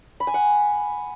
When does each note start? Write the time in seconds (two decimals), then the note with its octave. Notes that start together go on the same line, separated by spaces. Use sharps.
0.20 B5
0.27 G#5
0.34 F#5